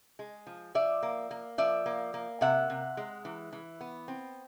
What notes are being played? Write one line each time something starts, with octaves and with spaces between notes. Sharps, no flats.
G#3
F3
F3 D5 E5
A#3
A#3
F3 D5 E5
A#3
A#3
C3 E5 F#5
C3
G#3
E3
E3
B3
C4